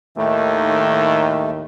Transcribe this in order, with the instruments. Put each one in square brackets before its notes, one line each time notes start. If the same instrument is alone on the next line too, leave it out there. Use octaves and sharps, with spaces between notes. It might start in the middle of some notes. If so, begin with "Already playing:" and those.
[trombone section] D#2 A2 D#3 [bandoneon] A3